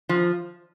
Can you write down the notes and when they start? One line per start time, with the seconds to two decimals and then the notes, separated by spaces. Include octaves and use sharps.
0.09 F3